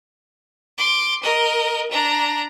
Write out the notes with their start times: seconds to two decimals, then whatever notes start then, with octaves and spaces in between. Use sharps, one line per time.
0.77 C6 D6
1.23 A#4 D#5
1.91 D4 A#5